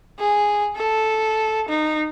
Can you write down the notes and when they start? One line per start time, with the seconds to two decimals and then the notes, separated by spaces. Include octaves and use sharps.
0.19 G#4
0.76 A4
1.69 D#4